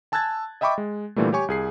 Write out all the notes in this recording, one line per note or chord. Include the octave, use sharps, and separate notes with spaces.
G#5 A5 E6 F#6 G#6 A6
D#5 E5 G5 B5 C#6 D6
G#3
A#2 D3 E3 G3 A3
G4 C#5 G#5 C#6
C2 G#4 C7